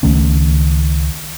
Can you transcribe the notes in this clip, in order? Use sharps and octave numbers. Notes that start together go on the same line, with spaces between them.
C#2 D#3 A3 C#4